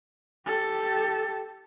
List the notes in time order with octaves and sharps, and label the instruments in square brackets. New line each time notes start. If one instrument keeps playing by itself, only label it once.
[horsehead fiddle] G4 A4